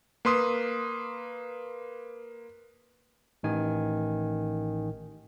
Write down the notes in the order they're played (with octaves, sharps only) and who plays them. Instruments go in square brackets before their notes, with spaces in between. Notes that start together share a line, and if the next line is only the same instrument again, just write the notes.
[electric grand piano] A#3 B4 C6 D#6
[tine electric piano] A1 D#3 G#5